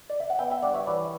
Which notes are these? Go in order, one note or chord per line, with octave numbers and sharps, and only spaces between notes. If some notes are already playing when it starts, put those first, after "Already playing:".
D5
E5
F#5
B3 E5 G5
E5 G5
G2 D5 F#5
C#5 E5
E3 B4 D5